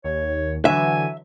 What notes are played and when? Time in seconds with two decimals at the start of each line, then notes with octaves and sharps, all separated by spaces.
0.04 D#2 C#5
0.65 D3 E3 F#3 E5 G#5